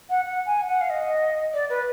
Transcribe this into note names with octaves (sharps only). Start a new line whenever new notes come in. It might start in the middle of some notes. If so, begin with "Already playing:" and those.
F#5
F#5
G#5
F#5
F5
D#5
D5
B4